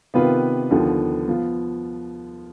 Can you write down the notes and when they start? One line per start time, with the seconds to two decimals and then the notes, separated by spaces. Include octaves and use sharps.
0.14 C3 D#3 B3 F4 B4
0.70 D#2 D3 F3 B3 F4
1.28 F3 B3 F4